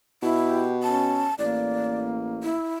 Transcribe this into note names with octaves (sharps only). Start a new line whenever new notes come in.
B2 E4
G4
C#4 A5
A1 A#3 D5
E4